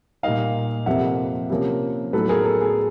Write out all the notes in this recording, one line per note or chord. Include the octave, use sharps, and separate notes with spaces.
A#2 G3 A#3 D#4 D#5 F5
F2 C3 F3 A#3 E5 F#5
C3 F3 A#3 C#4
A2 F#3 B3 D#4 A4 B4
G#4 A#4
A4
G#4